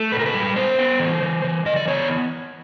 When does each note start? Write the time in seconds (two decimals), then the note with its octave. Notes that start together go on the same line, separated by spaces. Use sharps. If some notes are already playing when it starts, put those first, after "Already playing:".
Already playing: A3
0.12 A#2 B4
0.19 A#4
0.26 B4
0.34 G3
0.56 B3 C5
0.79 B3
0.99 E3
1.23 E3
1.44 E3
1.66 E3 D#5
1.76 D5
1.87 B3 C#5